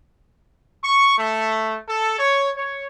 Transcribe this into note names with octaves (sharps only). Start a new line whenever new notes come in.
C#6
A3
A4
C#5
C#5